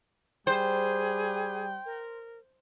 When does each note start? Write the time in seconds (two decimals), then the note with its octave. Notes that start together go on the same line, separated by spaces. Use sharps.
0.47 G3 G#4 C5 G5
1.85 A#4